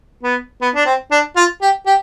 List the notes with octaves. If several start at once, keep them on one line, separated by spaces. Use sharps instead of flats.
B3
B3
D4
C4
D4
F4
G4
G4